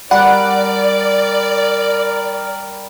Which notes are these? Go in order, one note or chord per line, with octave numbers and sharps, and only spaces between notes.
G3 A#4 D5 F#5